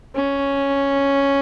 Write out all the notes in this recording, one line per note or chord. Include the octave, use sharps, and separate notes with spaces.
C#4